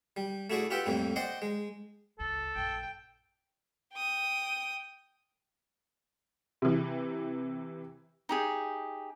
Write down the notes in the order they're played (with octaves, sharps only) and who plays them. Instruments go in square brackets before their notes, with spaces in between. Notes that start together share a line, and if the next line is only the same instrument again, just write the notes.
[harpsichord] G3
A3 E4 F#4 G#4 D5
F4 G4 B4 E5 F#5 G5
F2 A2 G3 A#3
C5 D5 D#5 F#5 G5 C6
G#3
[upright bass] G1 C#2 [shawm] A4
[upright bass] A#1 F#2 [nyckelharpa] G5
[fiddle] G5 D#6
[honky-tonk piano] C3 E3
[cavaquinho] D#4 G4 G#4